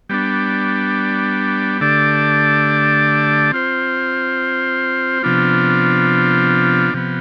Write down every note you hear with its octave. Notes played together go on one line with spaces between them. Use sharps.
G3 B3 D4
D3 A3 D4 G4 D5
C4 F4 C5
C3 F3 B3 D4 F4
C3 F3 B3